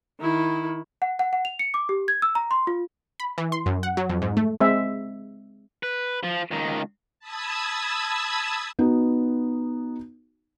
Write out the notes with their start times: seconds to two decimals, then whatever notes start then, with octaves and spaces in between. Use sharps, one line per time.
0.20 D#3 E4
1.02 F#5
1.19 F#5
1.33 F#5
1.45 F7
1.59 C#7
1.74 D6
1.89 G4
2.08 G#6
2.22 E6
2.35 A#5
2.51 C6
2.67 F4
3.20 B5
3.38 E3
3.52 C6
3.66 F#2
3.83 F#5
3.97 F#3
4.09 F2
4.22 G#2
4.37 A3
4.60 G#3 C4 E5
5.83 B4
6.23 F3
6.51 C#2 D#3
7.20 A5 B5 D#6 E6 G#6
8.79 B3 D#4 F#4